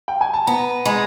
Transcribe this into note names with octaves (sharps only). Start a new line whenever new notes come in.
G5
G#5
A5
B3 A#5
G#3 B5